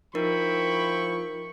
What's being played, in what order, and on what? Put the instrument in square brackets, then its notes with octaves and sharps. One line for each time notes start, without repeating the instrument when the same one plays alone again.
[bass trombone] F3 [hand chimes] D#4 A#4 [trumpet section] E4 G5 B5 [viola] C#6